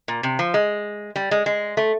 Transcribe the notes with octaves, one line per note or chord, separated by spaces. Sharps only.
A#2
C3
F3
G#3
G3
G#3
G#3
A3